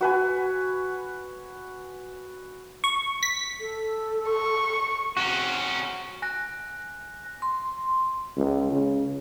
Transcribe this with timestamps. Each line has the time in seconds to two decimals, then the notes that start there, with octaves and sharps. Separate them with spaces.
0.01 F#4 B4 G#5
2.84 C#6
3.23 B6
3.60 A4
4.30 C#6
5.17 C3 C#4 F#4
6.22 G#5 F#6 A#6
7.42 C6
8.36 C#2
8.72 C#3